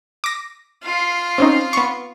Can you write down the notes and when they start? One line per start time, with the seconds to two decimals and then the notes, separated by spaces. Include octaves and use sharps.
0.24 D6 A#6
0.83 F4 F5
1.38 C4 C#4 D#4
1.73 B3 C#6